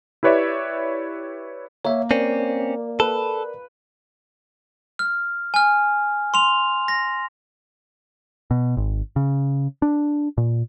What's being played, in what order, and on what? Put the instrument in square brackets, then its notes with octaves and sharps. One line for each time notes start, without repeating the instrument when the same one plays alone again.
[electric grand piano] E4 G4 B4 C#5 D5 E5
[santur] A#3 [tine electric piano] C#5 E5
[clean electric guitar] C4 C#4 [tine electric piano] A#4 D5
[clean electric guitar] A4 [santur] B4
[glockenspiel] F6
G#5 F6
C6 F7
A#6
[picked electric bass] B2
G#1
C#3
D4
A#2